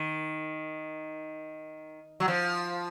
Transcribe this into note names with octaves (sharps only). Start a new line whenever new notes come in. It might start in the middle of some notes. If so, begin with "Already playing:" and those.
Already playing: D#3
F#3
F3